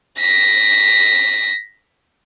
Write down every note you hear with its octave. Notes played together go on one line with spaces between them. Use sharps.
A#6 B6